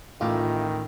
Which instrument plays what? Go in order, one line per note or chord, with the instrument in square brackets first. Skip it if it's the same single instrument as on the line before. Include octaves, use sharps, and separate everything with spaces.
[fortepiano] A1 A2 D6 [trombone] D#3 [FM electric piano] F4